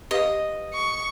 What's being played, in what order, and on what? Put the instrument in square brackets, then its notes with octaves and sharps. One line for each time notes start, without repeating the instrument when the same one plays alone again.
[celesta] G4 B4 F5 [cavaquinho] D#5
[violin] C#6